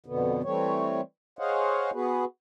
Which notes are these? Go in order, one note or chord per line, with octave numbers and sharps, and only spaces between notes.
F2 B2 D3 B3
E3 G3 A3 C4 C#5
G#4 C5 C#5 D#5 F5 F#5
B3 F#4 G#4 B4